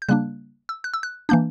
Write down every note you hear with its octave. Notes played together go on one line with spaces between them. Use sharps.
G6
C#3 G3 A#3 D4 F#6
E6
F#6
E6
F#6
E3 A#3 D4 G6